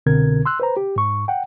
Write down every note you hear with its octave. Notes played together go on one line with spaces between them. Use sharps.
C2 B2 D3 C4 A#4 G#6
C6 E6 F#6
B4 C5 A#5
G4
G#2 C#6
F#5 G5